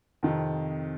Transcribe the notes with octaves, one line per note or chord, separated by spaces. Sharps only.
F2 C3 D#3